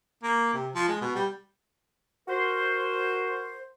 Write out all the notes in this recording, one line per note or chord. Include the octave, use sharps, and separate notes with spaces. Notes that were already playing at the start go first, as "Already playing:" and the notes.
A#3
C3
F3
G#3
B2
G3
F#4 A#4 C5